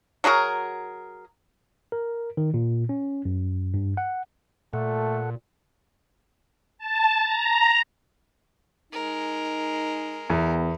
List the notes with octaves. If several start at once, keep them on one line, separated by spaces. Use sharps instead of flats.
F#3 F#4 G#4 A#4
A#4
D#3
A#2
C#4
F#2
G2
F#5
A#2 A3 A4 F#5
A5
A#5
G#3 D#4 A#4
E2 B3